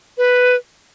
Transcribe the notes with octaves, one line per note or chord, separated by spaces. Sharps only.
B4